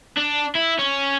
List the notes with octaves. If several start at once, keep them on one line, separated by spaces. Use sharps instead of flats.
D4
E4
C#4